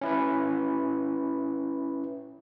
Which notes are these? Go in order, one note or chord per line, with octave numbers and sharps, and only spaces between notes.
C#4 E4 B4